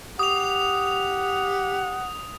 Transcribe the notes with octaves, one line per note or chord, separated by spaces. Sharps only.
G4 F#5 D#6 F7